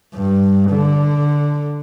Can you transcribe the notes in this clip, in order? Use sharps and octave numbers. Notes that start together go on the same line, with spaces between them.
G2
D3